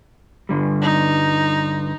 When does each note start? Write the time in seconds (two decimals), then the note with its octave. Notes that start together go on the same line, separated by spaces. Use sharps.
0.49 G2 D3 G3
0.82 D#4